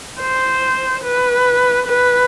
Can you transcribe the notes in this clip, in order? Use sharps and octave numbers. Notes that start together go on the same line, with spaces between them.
C5
B4
B4